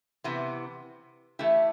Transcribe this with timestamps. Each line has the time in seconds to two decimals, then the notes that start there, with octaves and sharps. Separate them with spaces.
0.24 C3 E3 B3
1.39 E3 A3 E4 G4